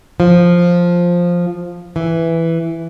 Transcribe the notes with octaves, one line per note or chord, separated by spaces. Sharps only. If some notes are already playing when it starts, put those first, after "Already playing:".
F3
E3